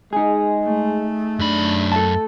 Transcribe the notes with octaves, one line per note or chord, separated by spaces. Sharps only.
G#3 D#4 G#4
A3
F#2 D4 B5
A4 A5